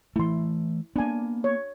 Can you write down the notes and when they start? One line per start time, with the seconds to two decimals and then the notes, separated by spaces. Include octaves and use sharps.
0.16 E3 A3 E4 C6
0.96 A#3 B3 D4 G#5
1.44 C#5